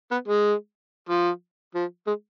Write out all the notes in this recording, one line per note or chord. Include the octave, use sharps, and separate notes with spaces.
B3
G#3
F3
F3
G#3